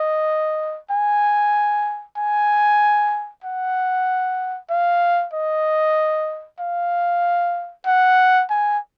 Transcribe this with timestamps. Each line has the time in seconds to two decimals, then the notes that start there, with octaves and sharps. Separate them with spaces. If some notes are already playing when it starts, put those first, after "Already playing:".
Already playing: D#5
0.91 G#5
2.17 G#5
3.44 F#5
4.70 F5
5.34 D#5
6.60 F5
7.87 F#5
8.50 G#5